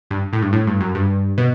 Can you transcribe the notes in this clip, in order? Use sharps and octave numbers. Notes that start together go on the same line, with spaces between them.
G2
A2
G2
A2
G2
F#2
G2
B2